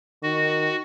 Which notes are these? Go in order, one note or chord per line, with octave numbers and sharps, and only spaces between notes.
D#3 F#4